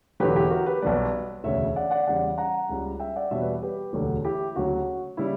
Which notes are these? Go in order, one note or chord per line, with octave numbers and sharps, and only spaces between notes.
E1 E2 D3 F#3 G4 B4
E4 G4
F#4 A#4
G4 B4
B1 B2 G3 B4 D5
E1 D2 C#3 C#5 E5
D5 F#5
D5 F#5
E2 C#3 G3 D5 F#5
F#5 A#5
C#2 C#3 G3
E5 G5
D5 F#5
E2 B2 G3 C#5 E5
B4 D5
G4 B4
E1 D2 D3 F#3
E4 G4
D2 C#3 F#3 F#4
C#3 G3 E4